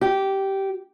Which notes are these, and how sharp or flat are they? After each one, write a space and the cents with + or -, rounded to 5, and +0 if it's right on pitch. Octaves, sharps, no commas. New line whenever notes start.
G4 -15